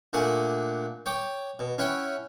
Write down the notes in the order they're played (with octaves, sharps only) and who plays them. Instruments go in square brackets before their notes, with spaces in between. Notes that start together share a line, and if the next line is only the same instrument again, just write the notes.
[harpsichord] A#2 A3 D4 F#5 G#5
C#5 G5 D6
B2
C#4 E4 F#5 G5